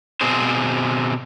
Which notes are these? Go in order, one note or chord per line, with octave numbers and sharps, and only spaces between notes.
B2 C4 D4 G#4 C5